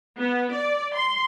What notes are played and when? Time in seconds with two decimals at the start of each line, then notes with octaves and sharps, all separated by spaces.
0.16 B3
0.51 D5
0.94 C6